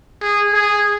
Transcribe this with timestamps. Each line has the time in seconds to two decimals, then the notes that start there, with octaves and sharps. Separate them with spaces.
0.22 G#4
0.53 G#4